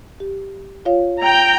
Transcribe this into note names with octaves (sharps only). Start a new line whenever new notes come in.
G4
F4 C#5 F5
G5 A#5